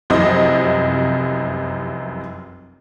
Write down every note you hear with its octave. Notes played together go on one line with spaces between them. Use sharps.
F1 C2 F#2 C3 F3 D#5